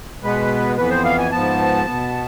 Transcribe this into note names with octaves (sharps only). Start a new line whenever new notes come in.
B2 G#3 B3 B4
F2 E3 B3 B4
C5
F5
G#5
G#2 F3 B3 A5
B2 B3